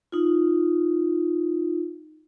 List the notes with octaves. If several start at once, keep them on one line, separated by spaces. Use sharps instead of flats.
D#4 F4